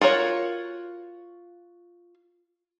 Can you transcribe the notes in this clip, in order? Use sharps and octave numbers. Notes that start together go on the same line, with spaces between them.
F4 F#4 A#4 C#5